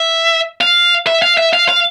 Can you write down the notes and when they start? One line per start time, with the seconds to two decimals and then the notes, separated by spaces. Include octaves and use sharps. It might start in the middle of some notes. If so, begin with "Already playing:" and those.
Already playing: E5
0.61 F5
1.07 E5
1.22 F5
1.37 E5
1.53 F5
1.69 F5